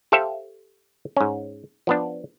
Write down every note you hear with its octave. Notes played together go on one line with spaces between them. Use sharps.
G4 A4 C5 E5 F5 G5
G#2 C#4
F3 B3 D4